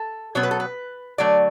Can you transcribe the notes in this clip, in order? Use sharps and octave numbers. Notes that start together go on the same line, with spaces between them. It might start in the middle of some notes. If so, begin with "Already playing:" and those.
Already playing: A4
B2 F#3 B3 C#5
B4
A4
B4
D3 F#3 A3 D5